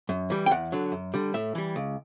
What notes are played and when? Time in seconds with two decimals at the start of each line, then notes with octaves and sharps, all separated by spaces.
0.09 F#2
0.30 E3 G3
0.46 G5
0.51 E2 F#5
0.72 D3 F#3
0.92 F#2
1.14 D3 G3
1.34 A2 E5
1.55 E3 G3
1.76 C#2